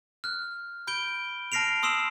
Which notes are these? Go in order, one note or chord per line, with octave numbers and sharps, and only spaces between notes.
F6 F#6
B5 G6 D7 G7
A5 F6 A#6 C7 D7 F7
C6 D#6 E6 C7 E7 F#7